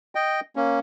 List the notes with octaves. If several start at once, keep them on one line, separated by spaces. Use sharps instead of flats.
D#5 G5
A#3 C#4